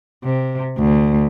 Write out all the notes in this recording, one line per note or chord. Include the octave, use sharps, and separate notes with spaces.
C3
D2